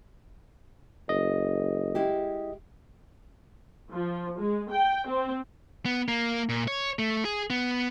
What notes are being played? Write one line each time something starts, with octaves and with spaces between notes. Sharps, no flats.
F#1 D#5
G#3 E4 G4
F3
G#3
G5
C4
B3
A#3
A#2
C#5
A3
G#4
B3